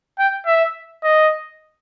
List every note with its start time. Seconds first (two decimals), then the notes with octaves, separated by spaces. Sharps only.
0.19 G5
0.47 E5
1.04 D#5